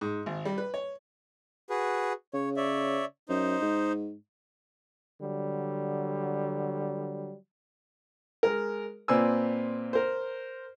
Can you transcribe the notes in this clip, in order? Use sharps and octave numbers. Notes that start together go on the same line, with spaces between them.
G#2
G#1
G3
B4
C#5
F#4 G#4 B4
C#3 C#5
C#5 D5 E5
F#2 D#4 C5
G#2
D3 F#3 G3
G#3 A#4
A#2 C4 B4 D5 G#5 E6
A#4 C5